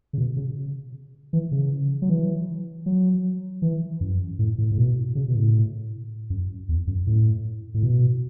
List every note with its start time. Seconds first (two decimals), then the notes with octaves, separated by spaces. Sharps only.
0.13 C#3
0.18 B2
0.37 C#3
1.33 E3
1.52 C#3
2.02 F#3
2.09 E3
2.86 F#3
3.62 E3
4.01 F#2
4.39 A2
4.58 A2
4.72 A2
4.78 B2
5.15 C#3
5.28 B2
5.35 A2
6.30 F#2
6.69 E2
6.87 F#2
7.07 A2
7.74 A2
7.83 B2